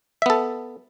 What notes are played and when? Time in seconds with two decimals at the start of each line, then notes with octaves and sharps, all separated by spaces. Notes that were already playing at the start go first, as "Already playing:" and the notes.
0.22 E5
0.26 B3
0.30 A4